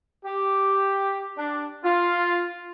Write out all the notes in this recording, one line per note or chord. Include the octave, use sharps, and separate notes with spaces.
G4
D4
F4